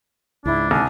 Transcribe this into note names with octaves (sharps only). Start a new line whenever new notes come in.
C#2 G#2 D4 E4
C2 G#5